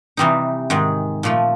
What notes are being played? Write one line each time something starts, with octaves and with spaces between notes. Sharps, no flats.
C3 E3 G3 C4 D#4
G#2 D#3 G#3
A#2 F3 A3